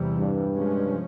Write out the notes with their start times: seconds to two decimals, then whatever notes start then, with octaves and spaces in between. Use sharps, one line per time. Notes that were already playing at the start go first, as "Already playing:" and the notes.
Already playing: E2 C3 E3 G3
0.18 G2
0.54 C3 F3 G#3 C#4